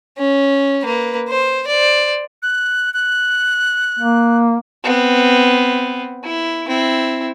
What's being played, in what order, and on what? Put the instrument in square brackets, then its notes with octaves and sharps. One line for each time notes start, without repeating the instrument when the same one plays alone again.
[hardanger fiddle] C#4
A#3 B4
C5
C5 D5
[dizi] F#6
F#6
[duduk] A#3
[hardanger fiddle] B3 C4
E4
C4 E4